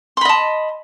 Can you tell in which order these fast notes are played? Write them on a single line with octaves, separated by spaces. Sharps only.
C6 B5 D#5 A5